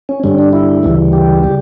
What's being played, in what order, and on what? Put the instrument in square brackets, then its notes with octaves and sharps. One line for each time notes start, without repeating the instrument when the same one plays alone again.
[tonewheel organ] C#4
G2 D3 G3 C#4
D4
E4
D2 C#3 E3 G3
G4
C#3 G3